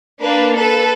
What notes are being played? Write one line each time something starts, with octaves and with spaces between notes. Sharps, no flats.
A#3 D4 B4
A4 B4